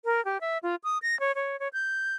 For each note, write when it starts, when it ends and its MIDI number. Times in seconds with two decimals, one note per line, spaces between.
0.05 0.23 70
0.25 0.40 67
0.41 0.58 76
0.63 0.75 65
0.84 0.98 87
1.02 1.18 94
1.20 1.32 73
1.35 1.59 73
1.60 1.68 73
1.73 2.16 91